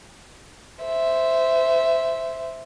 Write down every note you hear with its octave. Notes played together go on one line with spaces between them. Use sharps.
C5 E5